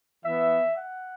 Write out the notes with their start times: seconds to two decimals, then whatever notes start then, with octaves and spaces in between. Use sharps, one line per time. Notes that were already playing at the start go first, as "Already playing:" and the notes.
0.24 E3 B3 E5
0.77 F#5